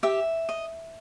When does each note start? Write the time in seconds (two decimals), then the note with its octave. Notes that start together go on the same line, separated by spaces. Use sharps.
0.03 G4 E5
0.49 D#5